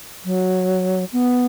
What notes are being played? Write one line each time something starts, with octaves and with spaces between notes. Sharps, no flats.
F#3
B3